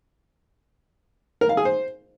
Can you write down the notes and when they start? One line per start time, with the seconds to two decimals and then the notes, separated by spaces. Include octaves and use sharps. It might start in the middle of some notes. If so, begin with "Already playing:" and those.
1.41 A#4
1.49 F5
1.57 G#4
1.65 C5